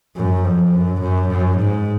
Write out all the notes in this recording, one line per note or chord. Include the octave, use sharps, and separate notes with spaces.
F#2
F2
F#2
F#2
F#2
G#2